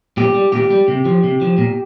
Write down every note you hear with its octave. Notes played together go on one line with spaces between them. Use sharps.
A#2 G4
G3
A#2 G4
G3
C3
F3
C3
F3
A#2